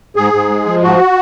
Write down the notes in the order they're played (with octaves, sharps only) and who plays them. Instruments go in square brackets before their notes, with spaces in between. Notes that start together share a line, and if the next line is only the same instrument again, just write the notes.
[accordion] G#2 G#4
G#2
G#3
F3
G#2 F#4